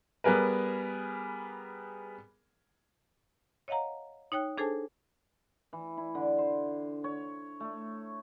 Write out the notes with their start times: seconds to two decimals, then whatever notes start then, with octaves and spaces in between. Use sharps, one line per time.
0.24 G3 B3 G#4 A#4 B4
3.68 C#5 D#5 F5 F#5 A#5
4.32 D#4 C#5 G5 F#6
4.58 D4 G#4 A4 C5 G#5 A5
5.73 E3
5.97 E4
6.15 D3
6.38 C5
7.04 C#5
7.60 A3